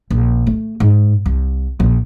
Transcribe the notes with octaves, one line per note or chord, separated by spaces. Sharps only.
A#1
A3
G#2
C2
A#1